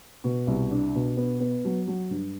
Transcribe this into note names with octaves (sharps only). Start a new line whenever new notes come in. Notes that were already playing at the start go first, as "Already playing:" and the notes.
B2
C2
D4
B2
B3
B3
F#3
F#3
G2